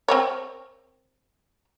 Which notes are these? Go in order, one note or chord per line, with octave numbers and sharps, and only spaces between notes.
C4 A#4 C#5